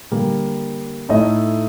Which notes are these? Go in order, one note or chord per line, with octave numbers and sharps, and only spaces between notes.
D3 G3 A#3
A2 A3 D#4 A4 D#5